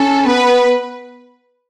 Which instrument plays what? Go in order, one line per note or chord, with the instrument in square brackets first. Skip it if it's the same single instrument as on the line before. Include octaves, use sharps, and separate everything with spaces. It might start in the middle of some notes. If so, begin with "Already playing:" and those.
Already playing: [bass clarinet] C#4 [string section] A4
[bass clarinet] B3 [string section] B4